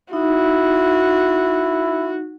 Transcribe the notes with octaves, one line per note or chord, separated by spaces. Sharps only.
D#4 E4 F#4